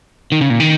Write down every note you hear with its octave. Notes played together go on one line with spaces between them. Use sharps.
D#3
C#3
A#2
D#3